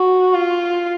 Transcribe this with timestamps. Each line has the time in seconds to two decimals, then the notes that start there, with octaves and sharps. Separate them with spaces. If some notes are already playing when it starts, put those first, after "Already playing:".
Already playing: F#4
0.34 F4